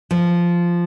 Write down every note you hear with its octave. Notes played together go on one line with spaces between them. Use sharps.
F3